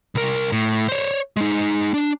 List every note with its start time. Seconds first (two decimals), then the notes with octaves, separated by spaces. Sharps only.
0.15 C2 A#4
0.52 A2
0.88 C5 C#5
1.37 G#3 D#4
1.94 D4